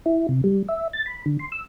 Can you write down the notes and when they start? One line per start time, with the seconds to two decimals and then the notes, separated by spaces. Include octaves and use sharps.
0.06 E4
0.29 C3
0.44 G3
0.69 E5
0.93 A6
1.06 B5
1.26 D3
1.39 C6
1.52 E6